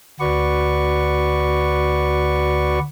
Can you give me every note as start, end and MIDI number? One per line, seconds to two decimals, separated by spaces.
0.20 2.79 38
0.20 2.79 66
0.20 2.79 71
0.20 2.79 74
0.20 2.79 85